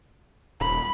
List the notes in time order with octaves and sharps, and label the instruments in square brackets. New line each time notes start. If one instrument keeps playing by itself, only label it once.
[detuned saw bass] D#1 [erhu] B5